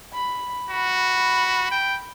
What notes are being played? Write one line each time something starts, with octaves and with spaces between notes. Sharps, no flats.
B5
F#4 B5
G5